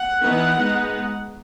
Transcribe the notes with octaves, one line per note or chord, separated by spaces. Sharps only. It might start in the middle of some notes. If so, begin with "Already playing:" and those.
Already playing: F#5
E3 B3 D#4
G#3 B3 D#4